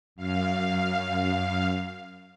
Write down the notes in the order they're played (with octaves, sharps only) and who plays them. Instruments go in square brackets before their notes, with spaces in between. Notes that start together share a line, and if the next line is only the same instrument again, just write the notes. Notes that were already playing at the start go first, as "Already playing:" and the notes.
[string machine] F#2 F5